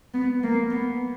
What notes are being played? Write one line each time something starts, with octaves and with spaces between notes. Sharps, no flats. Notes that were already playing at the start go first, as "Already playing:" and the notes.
B3
A#3
B3